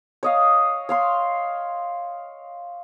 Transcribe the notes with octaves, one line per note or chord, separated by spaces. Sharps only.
C#5 D#5 F5
C#5 F5 C6